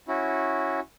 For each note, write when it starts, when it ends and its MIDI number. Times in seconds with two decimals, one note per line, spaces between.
0.08 0.80 61
0.08 0.80 64
0.08 0.80 66